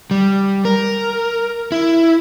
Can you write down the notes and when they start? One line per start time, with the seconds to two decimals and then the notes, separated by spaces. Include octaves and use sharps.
0.11 G3
0.65 A#4
1.72 E4